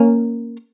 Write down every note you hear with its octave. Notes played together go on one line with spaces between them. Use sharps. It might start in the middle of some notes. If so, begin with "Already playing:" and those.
Already playing: A#3 C#4